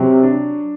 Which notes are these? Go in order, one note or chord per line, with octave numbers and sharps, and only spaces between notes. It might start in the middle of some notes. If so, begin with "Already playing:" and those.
Already playing: C3 F#3
D4